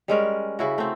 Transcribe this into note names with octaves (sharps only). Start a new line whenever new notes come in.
G3 G#3 C#4 A#4
C#3 E4 F#4
A3 C4